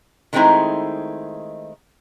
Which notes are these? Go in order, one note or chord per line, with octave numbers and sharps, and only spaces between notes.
D#3 G#3 A3 C4 D#4 E4